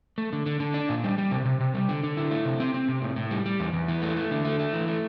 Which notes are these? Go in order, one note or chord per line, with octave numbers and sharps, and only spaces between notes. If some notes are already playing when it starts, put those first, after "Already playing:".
A3
D3
D3
D3
D4
A#2
G3
G3
C3
C3
C3
G3
D3
D3
E4
A3
C3
C4
C4
C3
A2
A2
G3
G3
E2
E2
E3
A3
A3
D3
A3
A3
E3
A3